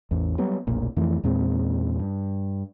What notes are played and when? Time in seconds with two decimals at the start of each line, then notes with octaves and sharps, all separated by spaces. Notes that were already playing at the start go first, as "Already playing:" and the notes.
0.11 A1 E2
0.38 F#3 G3 B3
0.67 F1 B1 A#2
0.96 F2 E3 A3
1.23 E2 A#2 G#3 C4
1.99 G2